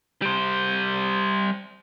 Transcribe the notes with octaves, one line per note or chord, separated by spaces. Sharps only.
G3 C5